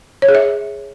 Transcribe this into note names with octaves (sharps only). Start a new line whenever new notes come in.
C#5
G#4
E5